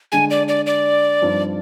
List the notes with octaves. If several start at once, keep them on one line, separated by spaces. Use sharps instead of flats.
D3 G#3 D4 G#4 G#5
D5
D5
D5
G2 F3 C4 D#4